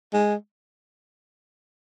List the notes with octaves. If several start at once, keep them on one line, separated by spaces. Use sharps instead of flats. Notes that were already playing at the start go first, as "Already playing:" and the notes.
G#3